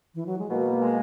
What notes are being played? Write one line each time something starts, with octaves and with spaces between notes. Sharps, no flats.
E3
F#3
G#3
B2 A#3
G#3